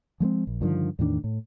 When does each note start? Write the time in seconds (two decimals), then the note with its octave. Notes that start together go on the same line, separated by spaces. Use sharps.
0.20 F3 G#3 A3 C4
0.47 A#1
0.61 G2 D3 D#3 F3
0.99 E2 A2 D#3 D4
1.24 A2